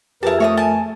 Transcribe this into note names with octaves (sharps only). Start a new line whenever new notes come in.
F2 E4 G4 G#4 A#4 B4 A5
A3 C#5 E5 A5 D#6
G#5 A5